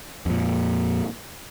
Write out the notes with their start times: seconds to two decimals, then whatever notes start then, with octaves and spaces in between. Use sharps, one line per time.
0.26 F2 A#2